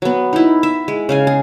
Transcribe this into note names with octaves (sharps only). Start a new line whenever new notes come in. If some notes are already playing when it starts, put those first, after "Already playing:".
F#3 B3
D#4 E4
E5
G#3
C#3 F5 G#5
G#4